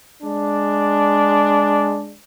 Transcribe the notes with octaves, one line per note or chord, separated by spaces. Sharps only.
G#3 D4